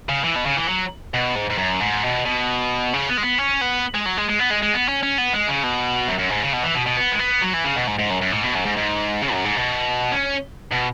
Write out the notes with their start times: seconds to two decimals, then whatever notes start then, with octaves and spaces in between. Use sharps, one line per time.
0.09 C#3
0.24 E3
0.36 B2
0.46 C#3
0.57 E3
0.68 F#3
1.14 B2
1.35 G#2
1.50 G#2
1.58 F#2
1.80 G#2
2.04 B2
2.25 B2
2.93 C#3
3.09 B3
3.17 G#3
3.23 B3
3.38 C#4
3.61 B3
3.94 G#3
4.06 F#3
4.17 G#3
4.29 G#3
4.39 B3
4.50 G#3
4.62 G#3
4.73 B3
4.88 C#4
5.03 C#4
5.18 B3
5.33 G#3
5.48 C#3
5.63 B2
6.08 F#2
6.18 F#2
6.30 G#2
6.42 C#3
6.53 B2
6.63 E3
6.75 B2
6.87 B2
6.97 B3
7.12 G#3
7.19 B3
7.42 F#3
7.54 E3
7.64 C#3
7.76 B2
7.88 G#2
7.99 G#2
8.10 F#2
8.21 F#2
8.32 G#2
8.44 B2
8.55 F#2
8.65 G#2
8.77 G#2
9.22 C#3
9.33 F#2
9.45 G#2
9.56 B2
10.12 C#4
10.72 B2